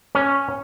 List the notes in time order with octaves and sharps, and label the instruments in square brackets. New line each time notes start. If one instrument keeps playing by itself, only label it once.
[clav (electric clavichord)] C#4